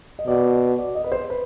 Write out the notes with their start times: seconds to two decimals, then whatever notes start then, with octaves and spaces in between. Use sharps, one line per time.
0.19 D#5
0.27 B2 D5
0.52 D5
0.79 D5
0.95 D#5
1.04 B4
1.12 C5
1.30 B4